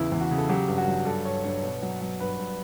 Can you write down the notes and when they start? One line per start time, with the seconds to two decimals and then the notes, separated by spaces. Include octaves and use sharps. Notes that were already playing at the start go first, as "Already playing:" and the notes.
Already playing: E2 C#3 E4
0.12 E2
0.21 F#4
0.31 C#3
0.38 A4
0.49 F#3 G4
0.68 G2
0.78 F#4
0.88 F#3
1.06 G2 A4
1.25 G2 C#5
1.43 G2 C#5
1.63 B2
1.82 F#3
2.01 F#3
2.20 G2 B4
2.38 G2